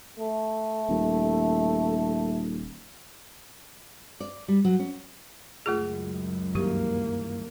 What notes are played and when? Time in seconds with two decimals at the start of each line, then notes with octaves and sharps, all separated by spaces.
0.19 A3
0.89 D#1
4.20 D5
4.48 G3
4.65 F#3
4.79 C#4
5.66 C#2 F#2 A3 F4 G#4
6.55 G2 D#3 E3 A#3 G4 C#6